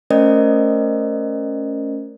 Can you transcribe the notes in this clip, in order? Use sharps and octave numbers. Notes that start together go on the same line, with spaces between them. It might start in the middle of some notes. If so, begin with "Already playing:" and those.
A3 C#4 A#4 C5 D5 D#5